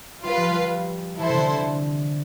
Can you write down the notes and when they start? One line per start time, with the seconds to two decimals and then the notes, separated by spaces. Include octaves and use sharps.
0.24 G3 F4 B4 F5
0.37 F3
0.50 G3
1.19 E3 E4 A4 C5
1.28 C3
1.34 D3